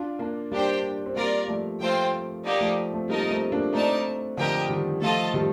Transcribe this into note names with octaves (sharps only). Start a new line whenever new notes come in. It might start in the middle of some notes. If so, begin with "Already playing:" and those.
Already playing: D4 F4
A#3 D4
G3 A#3 D4 G4 C5 G5
C4
G3 A#3 F4 A#4 D5
F3 A3
F3 A3 C4 F4 C5 G5
A#3 D#4 G4 D5
F3 A3
A3 C4
G3 A#3 D#4 A#4 D#5 A5
A3 C4
A#3 D4
A3 C4 D#4 A#4 D5 A5
D3 F3 G4 A#4 D#5 G5
D#3 G3
F3 A3 F4 A4 D#5 A5
D#3 G3